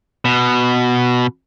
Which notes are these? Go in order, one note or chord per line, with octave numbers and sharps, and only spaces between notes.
B2